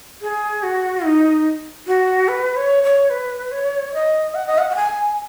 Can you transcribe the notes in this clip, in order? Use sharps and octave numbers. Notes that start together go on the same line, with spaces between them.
G#4
F#4
D#4
F#4
B4
C#5
C#5
B4
C#5
D#5
F#5
D#5
F#5
F#5
G#5